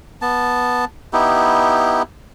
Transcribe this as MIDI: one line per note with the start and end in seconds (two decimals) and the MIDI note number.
0.22 0.85 59
0.22 0.85 81
1.13 2.02 59
1.13 2.02 63
1.13 2.02 64
1.13 2.02 67